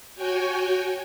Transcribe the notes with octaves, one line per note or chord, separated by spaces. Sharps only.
F#4 C#5 G5 G#5